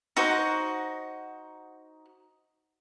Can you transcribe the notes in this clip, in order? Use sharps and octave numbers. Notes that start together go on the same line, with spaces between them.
D#4 F#4 C5 F#5